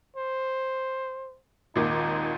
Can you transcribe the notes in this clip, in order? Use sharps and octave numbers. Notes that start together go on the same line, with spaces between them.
C5
G#1 D#2 A#2 D#4